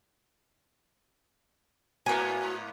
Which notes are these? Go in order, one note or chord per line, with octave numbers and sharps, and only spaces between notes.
G#2 A#3 B3 F#4 A#4 G#5